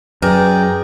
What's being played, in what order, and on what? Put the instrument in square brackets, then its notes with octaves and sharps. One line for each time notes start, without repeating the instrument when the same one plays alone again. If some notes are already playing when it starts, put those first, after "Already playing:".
[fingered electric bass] F#2 [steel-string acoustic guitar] G#4 [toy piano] B4 [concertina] D5 G5 A#5